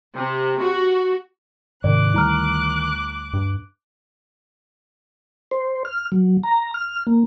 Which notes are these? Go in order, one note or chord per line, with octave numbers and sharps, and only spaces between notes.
C3
F#4
G#2 C3 D#3 D5 D6 F#6
D2 G3 E4 A#5 F6
G2
C5
F6
F#3
A#5
F6
A#3